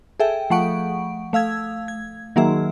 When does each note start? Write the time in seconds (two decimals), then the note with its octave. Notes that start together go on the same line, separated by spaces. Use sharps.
0.20 G#4 A4 E5 G5
0.50 F3 A3 F#5 C#6 D7
1.33 A3 F5 E6 G#6
1.88 G#6
2.36 D#3 F#3 A#3 G#4 E5